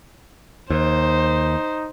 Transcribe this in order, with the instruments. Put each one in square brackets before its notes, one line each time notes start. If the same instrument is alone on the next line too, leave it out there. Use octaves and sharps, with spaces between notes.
[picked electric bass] D#2 [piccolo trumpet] D#4 [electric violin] C5